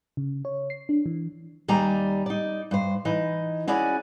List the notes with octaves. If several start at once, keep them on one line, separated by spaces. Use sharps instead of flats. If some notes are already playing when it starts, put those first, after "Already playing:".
C#3
C#5
C7
D4
E3
D#2 G3 D5 G#5 A#5
D#4 D5
G2 C5
E3 D#4
C#4 E4 F#4 G#4 D5 G#5